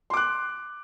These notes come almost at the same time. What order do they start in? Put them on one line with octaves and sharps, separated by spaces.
C6 D6 F#6